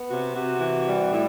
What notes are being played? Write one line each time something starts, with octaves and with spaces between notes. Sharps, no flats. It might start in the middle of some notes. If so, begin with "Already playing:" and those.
Already playing: B3
C3 F#4
C3 F#4
E3
G3
A2 E4